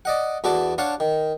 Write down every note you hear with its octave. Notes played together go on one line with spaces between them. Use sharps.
D5 D#5 F#5
E2 F#4 A4 D5 A5
D4 C#5 F5 F#5 A5
D#3